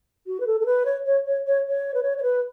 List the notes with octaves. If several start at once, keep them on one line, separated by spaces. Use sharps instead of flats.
F#4
B4
A4
A4
B4
C#5
C#5
C#5
C#5
C#5
B4
C#5
C#5
B4